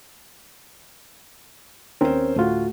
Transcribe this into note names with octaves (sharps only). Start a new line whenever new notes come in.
D#2 C4 C#4 A#4 C5
D2 A2 A3 F4 F#4